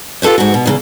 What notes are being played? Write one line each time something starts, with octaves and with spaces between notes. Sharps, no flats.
F4 G4 A4 B4 C5
G#2 F#4
B2
E2 A2 C#3